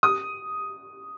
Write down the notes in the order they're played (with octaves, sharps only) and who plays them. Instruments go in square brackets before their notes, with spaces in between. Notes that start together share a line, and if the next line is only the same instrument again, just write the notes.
[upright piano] D#6